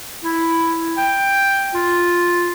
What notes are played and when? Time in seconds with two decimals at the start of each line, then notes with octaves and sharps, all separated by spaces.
0.24 E4
0.97 G5
1.74 F4